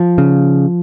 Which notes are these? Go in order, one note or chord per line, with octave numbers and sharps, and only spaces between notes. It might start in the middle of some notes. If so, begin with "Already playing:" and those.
Already playing: F3
C#3